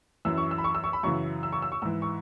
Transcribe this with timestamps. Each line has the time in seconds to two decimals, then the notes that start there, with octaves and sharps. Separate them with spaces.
0.25 F#2 E3 E6
0.38 C#6
0.51 E6
0.58 B5
0.64 C#6
0.75 E6
0.84 C#6
0.93 B5
1.03 F#2 C#3 E3 C#6
1.43 E6
1.53 C#6
1.62 E6
1.72 C#6
1.82 G#2 E3 E6
2.02 C#6